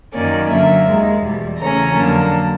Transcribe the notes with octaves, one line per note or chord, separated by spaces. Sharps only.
F#2 D#3 F#3 A#3 C#4 D5
F#2 D3 F#3 A#3 E5
D#2 D#3 G#3
E2 B2 G3
C#3 E3 A3 C#4 A#5
F2 D3 F#3 A#3 A5